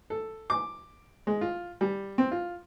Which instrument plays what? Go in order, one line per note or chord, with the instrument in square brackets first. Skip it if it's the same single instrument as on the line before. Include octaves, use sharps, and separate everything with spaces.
[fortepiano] A4
D6
G#3
F4
G3
C4
F4